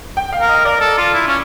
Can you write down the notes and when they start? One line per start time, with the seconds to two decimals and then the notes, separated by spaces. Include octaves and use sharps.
0.17 G5
0.33 F5
0.41 A#4
0.49 D#5
0.65 A#4 D5
0.81 A4
0.98 F4
1.14 E4
1.28 C#4